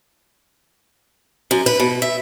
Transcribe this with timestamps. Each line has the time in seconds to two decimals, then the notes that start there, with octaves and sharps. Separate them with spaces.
1.51 F#2
1.66 B4
1.80 B2
2.02 E5